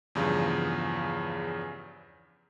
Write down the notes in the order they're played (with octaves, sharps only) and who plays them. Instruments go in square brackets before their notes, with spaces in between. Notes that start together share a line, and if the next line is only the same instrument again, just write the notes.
[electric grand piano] E2 G2 C#3 F3